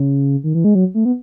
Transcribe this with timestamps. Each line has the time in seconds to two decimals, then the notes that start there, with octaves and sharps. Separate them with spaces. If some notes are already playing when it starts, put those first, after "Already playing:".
Already playing: C#3
0.44 D#3
0.55 E3
0.64 G#3
0.75 F#3
0.94 A3
1.05 B3